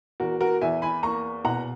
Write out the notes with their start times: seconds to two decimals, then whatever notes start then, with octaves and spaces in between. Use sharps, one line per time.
0.20 E2 F#4 A#4
0.40 F#4 A#4
0.61 E2 E5 G#5
0.82 G#5 B5
1.03 A#3 A#5 C#6
1.44 B2 F#5 A#5